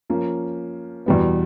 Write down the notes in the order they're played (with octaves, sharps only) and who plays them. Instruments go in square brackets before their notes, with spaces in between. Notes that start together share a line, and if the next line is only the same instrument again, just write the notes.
[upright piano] F3 A#3 C#4
E2 B2 G3 B3